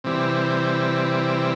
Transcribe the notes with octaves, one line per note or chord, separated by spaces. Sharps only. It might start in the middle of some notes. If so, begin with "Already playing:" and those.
C3 E3 G3